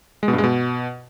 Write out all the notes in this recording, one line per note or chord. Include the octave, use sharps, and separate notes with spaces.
G#3
B2
G2
G#3
B2